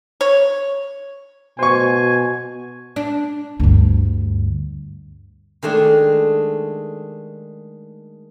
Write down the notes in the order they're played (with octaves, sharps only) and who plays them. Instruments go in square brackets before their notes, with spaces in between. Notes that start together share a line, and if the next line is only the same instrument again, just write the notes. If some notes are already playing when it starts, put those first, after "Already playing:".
[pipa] C#5
[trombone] B2 [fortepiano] C5 C#6 [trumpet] G#5
[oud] D4
[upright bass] D2 G2
[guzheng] D#3 G#3 A3 D4